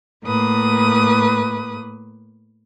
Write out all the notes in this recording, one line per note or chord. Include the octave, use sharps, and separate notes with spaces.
A2 A#3 B4 D#6